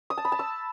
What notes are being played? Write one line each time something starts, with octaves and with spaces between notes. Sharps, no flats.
D#6
A5
B5
A5
E6